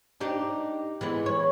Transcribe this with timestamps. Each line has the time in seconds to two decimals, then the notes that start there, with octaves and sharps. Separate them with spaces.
0.21 D4 D#4 G4
1.01 E3 G#3 B3
1.26 C#5